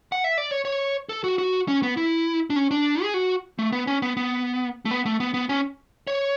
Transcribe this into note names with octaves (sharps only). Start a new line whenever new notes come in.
F#5
E5
D5
C#5
C#5
A4
F#4
F#4
C#4
B3
E4
D4
C#4
D4
G#4
F#4
A3
B3
C#4
B3
B3
A3
B3
A3
B3
B3
C#4
C#5